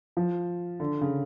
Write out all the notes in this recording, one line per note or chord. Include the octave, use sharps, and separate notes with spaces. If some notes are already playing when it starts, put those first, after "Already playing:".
F3
D3
C#3